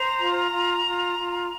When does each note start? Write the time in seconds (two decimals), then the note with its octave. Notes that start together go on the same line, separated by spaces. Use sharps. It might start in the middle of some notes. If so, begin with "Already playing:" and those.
Already playing: C5 A#5
0.18 F4
0.51 F4
0.84 F4
1.18 F4